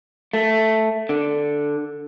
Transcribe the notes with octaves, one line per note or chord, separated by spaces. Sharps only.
A3
D3